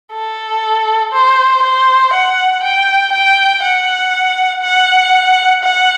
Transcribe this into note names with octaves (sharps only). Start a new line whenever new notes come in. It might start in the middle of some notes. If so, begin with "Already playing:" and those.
A4
C5
C5
F#5
G5
G5
F#5
F#5
F#5